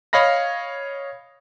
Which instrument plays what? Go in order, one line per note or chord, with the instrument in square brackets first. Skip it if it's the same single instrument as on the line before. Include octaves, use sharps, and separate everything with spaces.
[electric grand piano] C#5 D#5 F5 B5 A#6